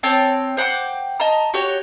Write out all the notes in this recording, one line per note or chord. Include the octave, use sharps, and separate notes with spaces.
C4 C#5 G5 A5
C5 F#5 G5 D6
D#5 A5 A#5
F#4 G4 C#5